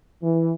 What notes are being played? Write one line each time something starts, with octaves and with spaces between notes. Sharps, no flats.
E3